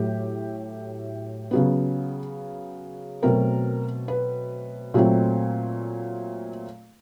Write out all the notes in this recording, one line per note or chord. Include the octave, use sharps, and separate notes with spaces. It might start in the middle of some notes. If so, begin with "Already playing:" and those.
Already playing: A2 F#3 A3 G4
C#3 F#3 B3
B2 F#3 A3 C4 A#4
B4
A#2 F#3 A3 C4